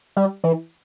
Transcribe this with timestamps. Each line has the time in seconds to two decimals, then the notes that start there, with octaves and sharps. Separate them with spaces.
0.17 G3
0.44 E3